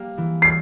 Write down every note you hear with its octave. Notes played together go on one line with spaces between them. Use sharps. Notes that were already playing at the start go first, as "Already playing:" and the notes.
Already playing: G3 A#3
E3
C7